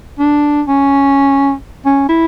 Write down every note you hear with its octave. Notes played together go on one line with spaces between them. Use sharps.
D4
C#4
C#4
E4